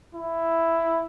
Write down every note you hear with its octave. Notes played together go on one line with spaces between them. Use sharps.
E4